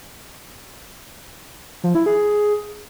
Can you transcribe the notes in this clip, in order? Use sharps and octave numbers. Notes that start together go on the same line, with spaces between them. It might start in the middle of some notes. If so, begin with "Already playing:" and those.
F3
E4
G#4